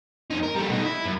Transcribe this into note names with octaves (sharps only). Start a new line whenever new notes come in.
F2 D#4
A#4
G3 A3
B2 D#4
E4
F#2